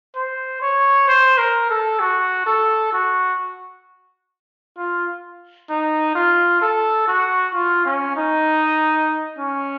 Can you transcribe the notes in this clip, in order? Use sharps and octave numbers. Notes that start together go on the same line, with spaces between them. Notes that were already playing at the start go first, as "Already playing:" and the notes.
C5
C#5
C5
A#4
A4
F#4
A4
F#4
F4
D#4
F4
A4
F#4
F4
C#4
D#4
C#4